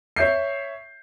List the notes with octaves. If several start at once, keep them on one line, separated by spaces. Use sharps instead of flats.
C#5 E5 G6 C7